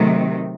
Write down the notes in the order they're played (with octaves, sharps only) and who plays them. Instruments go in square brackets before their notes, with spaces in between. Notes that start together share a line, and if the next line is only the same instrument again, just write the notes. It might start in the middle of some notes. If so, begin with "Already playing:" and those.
Already playing: [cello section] C3 D#3 F#3 A3